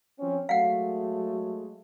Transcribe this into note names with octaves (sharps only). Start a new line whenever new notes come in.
F3 C4 C#4
F#3 G#3 A3 F5 F#5